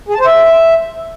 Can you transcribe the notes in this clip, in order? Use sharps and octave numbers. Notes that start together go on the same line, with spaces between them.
G#4
A5
C5
E5